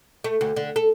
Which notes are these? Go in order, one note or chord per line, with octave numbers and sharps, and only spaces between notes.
A3
D2
D3
A4